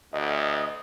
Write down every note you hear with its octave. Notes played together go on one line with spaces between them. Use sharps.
D2 D#5